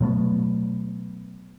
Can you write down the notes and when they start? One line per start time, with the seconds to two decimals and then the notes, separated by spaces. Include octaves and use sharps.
0.01 B2 F#3 A3 B3